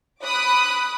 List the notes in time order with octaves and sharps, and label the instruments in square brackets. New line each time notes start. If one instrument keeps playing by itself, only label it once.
[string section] B5 D6 D#6 F#6